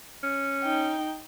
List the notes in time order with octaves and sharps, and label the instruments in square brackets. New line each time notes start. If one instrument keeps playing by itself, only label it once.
[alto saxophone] C#4
[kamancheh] D#4 G5